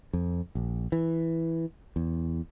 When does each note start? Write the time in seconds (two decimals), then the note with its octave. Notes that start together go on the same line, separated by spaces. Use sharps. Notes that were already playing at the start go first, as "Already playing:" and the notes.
0.13 F2
0.55 A#1
0.92 E3
1.96 E2